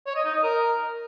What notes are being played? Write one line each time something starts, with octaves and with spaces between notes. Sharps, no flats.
C#5
D#5
D#4
D#5
A#4